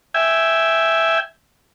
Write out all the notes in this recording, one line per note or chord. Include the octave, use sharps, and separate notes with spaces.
E5 G5 G#5